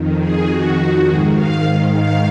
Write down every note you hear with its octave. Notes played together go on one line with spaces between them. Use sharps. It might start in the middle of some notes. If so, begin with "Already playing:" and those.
Already playing: F2 D#3
G#4
F2 D#3 F#4
G#2 D#3 G#4
F5
G#2 D#3
F5